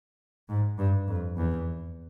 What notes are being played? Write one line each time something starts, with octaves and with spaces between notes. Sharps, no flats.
G#2
G2
F2
E2